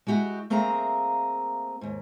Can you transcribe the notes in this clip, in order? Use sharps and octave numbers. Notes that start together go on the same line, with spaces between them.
G#3 E4 F#4 G4
A3 A#3 C4 G#4 E5 A#5
D#2 G#2